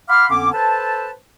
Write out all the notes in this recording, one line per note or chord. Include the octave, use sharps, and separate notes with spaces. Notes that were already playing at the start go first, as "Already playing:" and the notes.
F5 F#5 B5 C6 D6 F6
F2 D3 B3 C#4 D6
A4 B4 C5 A5